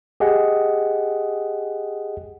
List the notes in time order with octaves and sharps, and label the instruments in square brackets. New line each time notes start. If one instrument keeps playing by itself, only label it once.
[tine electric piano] G4 G#4 D#5 F#5